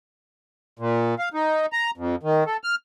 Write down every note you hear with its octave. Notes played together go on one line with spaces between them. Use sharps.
A#2
F5
D#4
A#5
F2
D#3
A4
F6